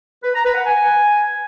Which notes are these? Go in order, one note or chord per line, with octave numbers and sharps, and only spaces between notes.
B4
A#5
B4
F#5
G#5